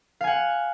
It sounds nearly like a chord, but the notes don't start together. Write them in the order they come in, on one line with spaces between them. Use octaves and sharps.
F5 G#5 F#5